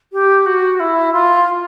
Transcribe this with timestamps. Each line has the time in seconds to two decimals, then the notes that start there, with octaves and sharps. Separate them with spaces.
0.12 G4
0.46 F#4
0.79 E4
1.13 F4